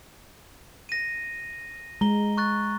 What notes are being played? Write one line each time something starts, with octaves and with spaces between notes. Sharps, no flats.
A#6 D#7
G#3 A#5 G7
C#6 F#6 A6